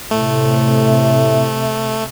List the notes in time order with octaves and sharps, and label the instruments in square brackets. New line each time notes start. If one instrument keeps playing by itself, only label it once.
[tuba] A2 [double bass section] C3 [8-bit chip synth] A3
[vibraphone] E5